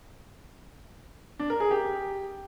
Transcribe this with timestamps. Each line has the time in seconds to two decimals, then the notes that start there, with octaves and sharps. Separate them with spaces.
1.39 D4
1.50 A#4
1.60 G#4
1.71 G4